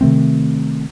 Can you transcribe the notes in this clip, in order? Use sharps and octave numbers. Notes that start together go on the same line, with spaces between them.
C3 D#3 A3 C4